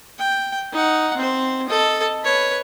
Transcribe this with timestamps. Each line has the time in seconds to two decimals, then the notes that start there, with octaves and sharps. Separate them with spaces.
0.19 G5
0.73 D#4 F#5
1.17 C4 C5
1.68 A4 D#5
2.23 B4 C#5